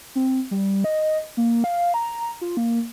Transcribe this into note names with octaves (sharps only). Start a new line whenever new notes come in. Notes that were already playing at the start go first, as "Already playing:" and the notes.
C4
G3
D#5
A#3
F5
A#5
F4
A#3